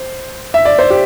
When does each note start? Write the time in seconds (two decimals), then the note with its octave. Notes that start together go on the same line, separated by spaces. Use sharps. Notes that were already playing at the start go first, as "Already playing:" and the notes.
Already playing: C5
0.54 E5
0.65 D5
0.79 C5
0.90 G4